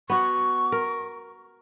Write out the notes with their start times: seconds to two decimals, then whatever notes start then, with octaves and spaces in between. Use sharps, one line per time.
0.10 B3 F#4 C#6
0.72 A#4